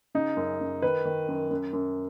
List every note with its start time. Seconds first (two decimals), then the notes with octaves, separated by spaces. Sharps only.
0.15 C#3 D#4
0.37 F#2
0.61 F#2
0.82 D#3 B4
1.05 D#3
1.28 F#2
1.51 F#2
1.73 F#2